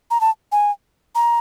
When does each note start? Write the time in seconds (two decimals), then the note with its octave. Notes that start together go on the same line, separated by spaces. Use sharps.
0.11 A#5
0.21 A5
0.52 G#5
1.15 A#5